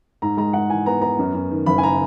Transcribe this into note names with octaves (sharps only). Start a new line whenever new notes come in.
G#2 A#5
G#3 A#5
G#2 F#5
E3 G#5
B3 A#5
B3 A#5
F#2
F#2
D#3
F#1 B5
G#5
A#5